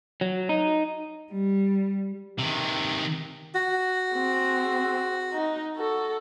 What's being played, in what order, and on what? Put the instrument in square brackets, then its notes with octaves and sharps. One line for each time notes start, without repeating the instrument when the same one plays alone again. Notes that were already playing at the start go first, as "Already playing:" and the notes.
[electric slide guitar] F#3
D#4
[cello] G3
[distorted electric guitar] C3 D#3
[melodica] F#4
[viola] C4 G#4
D#4
F#4 A4